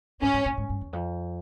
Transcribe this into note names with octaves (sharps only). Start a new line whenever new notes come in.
G#2 C#4
G#2
A#2
G#2
G2
E2
F2